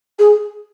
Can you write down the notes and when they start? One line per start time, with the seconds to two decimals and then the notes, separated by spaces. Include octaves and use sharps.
0.19 G#4